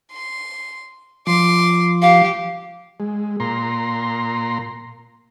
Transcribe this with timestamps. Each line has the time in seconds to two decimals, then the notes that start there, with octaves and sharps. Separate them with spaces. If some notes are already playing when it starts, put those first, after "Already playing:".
0.11 C6
1.27 F3 C6 D6
2.02 G4 F5
3.00 G#3
3.40 A#2 A#5 C6